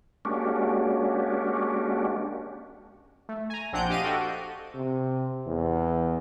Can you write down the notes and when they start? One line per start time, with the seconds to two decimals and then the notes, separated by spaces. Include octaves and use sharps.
0.25 G#3 A#3 C#4 D4 F#4 G4
3.29 A3
3.50 G#5 A#5
3.73 A#1 C4 D4 F#5 G6 D7
3.90 G4 D#5 F5 D7 D#7
4.03 F#4 A4 G5
4.75 C3
5.47 E2